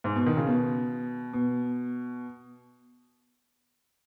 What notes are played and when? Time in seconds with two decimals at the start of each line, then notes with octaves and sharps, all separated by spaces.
0.04 G#2
0.16 B2
0.26 D#3
0.37 C#3
0.47 B2
1.33 B2